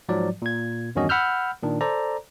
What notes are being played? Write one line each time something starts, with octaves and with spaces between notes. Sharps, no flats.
G#2 F3 F#3 D5
A#2 G#6
E2 G2 D#3 C#4 F#4 D#5
F#5 B5 E6 F6 G6
A#2 D#3 D4
A4 C5 D5 A#5